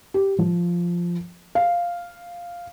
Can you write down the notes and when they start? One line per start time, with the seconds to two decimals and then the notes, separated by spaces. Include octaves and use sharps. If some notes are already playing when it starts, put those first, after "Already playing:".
0.14 G4
0.39 F3
1.55 F5